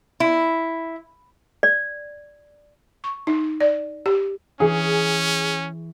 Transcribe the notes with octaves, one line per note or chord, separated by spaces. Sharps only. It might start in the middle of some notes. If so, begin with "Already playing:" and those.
E4
D5
C#6
D#4
D5
G4
E3 C#4 G#4 C#6